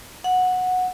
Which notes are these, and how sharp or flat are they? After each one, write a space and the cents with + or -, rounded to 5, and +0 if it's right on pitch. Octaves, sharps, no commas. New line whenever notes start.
F#5 -10